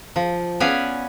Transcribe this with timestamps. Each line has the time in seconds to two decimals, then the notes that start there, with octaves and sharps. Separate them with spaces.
0.16 F3
0.60 B3 C#4 B4 D5 F5 G#5